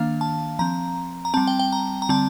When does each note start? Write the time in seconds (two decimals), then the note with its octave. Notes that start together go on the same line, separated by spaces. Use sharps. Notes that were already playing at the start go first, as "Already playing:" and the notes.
Already playing: D#3 A#3 D4 F5
0.21 A5
0.59 F3 C4 A#5
1.25 A#5
1.34 G3 C4 A5
1.47 G5
1.59 G5
1.72 A#5
2.02 A#5
2.09 D3 G3 C4 A5